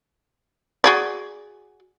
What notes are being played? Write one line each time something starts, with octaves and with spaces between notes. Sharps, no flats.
F#4 G#4 D5